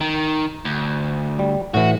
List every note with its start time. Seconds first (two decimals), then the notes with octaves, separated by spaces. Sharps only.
0.01 D#3
0.65 D2
1.39 G3
1.74 A2 E3 F#4